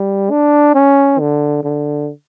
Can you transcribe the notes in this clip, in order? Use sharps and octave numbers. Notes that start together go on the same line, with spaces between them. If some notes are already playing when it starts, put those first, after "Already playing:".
Already playing: G3
D4
C#4
D3
D3